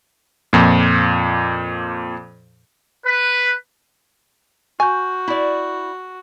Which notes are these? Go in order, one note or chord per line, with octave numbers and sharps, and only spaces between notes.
F2 A#2
B4
F#4 G#5 C#6 G6
E4 D5